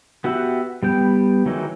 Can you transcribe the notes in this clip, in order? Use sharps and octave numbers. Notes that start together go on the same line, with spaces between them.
B3 F#4 G4 E5 F#5
G3 B3 G5
D#3 E3 F#3 G#3 D#4